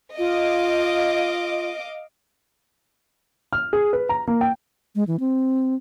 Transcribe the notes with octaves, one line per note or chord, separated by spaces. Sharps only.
F4 D#5 F5 D6
F6
G#4
B4
A#5
A#3
G5
G#3
E3
C4